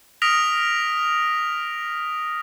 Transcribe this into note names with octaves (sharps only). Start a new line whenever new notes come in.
D#6 F6 A#6 B6 D7 F7